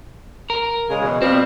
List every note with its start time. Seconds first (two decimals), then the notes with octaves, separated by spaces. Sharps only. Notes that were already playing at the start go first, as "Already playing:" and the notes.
0.50 A#4
0.89 C#3 G#3
1.01 E2 B2
1.22 B2 F3 G3 C4